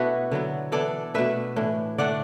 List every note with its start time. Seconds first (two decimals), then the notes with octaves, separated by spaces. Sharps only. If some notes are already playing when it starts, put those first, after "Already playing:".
Already playing: B2 A3 B3 D4 E4 F#4 A4 B4
0.31 D3 F#3 B3
0.72 E3 B3 D4 A4 D5
1.14 B2 A3 D4 B4 E5
1.56 A2 E3 D4
1.98 D3 A3 D4 D5 F#5